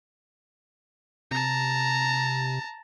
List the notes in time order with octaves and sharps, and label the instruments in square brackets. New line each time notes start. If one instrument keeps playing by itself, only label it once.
[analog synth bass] C3 [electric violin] A5 A#5